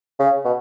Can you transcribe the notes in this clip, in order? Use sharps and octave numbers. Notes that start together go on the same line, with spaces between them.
C#3
B2